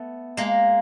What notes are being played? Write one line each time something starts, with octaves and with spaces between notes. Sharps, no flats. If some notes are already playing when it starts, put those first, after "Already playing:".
Already playing: A3 B3
G#3 A#3